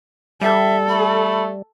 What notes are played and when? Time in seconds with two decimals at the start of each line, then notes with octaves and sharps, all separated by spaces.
0.41 G3 A4 E5
0.89 A3 B5